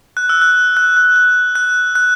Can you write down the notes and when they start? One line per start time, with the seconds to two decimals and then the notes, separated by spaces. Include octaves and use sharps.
0.17 F#6
0.29 E6
0.42 F#6
0.77 F#6
0.97 F#6
1.16 F#6
1.55 F#6
1.95 F#6